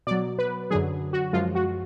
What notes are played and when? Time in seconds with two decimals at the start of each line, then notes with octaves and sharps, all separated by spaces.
0.07 B2 F#3 D5
0.39 B4
0.71 F#2 D3 F#3 G#4
1.13 F#4
1.33 F#2 F3 G#3 F4
1.55 F#4